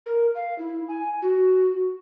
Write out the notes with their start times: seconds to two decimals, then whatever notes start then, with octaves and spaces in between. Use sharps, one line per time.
0.06 A#4
0.35 F5
0.58 E4
0.88 G#5
1.22 F#4